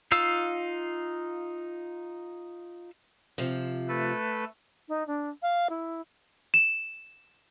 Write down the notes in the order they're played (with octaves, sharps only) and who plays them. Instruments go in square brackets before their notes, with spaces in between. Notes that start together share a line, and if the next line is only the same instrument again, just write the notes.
[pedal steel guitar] D#4 F4 F5 E6
[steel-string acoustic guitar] C3 F3
[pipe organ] A3 A4 B4
[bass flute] D#4
D4
F5
E4
[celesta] E7